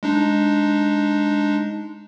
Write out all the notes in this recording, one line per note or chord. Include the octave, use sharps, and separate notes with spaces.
G#3 D4 D#4